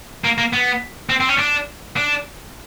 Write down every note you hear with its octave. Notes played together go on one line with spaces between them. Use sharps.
A#3
A#3
B3
C4
C4
C#4
D4
D4